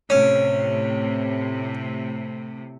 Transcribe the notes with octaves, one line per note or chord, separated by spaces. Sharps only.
A2 C3 C#4